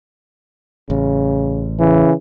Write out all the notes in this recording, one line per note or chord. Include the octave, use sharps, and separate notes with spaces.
A1 C#3
C#3 E3